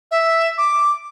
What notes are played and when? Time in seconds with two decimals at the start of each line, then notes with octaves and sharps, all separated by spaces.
0.11 E5
0.58 D6